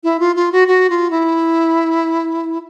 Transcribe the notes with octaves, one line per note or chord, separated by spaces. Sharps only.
E4
F4
F4
F#4
F#4
F4
E4